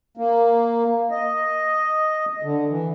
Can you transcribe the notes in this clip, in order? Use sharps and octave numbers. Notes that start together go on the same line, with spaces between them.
A#3
D#5
D3
E3